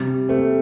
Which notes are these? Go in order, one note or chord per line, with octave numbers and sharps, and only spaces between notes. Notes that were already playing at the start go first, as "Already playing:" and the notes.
Already playing: C3 G3
A3 C4